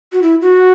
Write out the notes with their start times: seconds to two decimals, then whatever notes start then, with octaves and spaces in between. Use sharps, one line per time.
0.12 F#4
0.22 E4
0.41 F#4